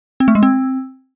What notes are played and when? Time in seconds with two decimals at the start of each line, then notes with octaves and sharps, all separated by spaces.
0.20 C4
0.28 A3
0.35 G#3
0.43 C4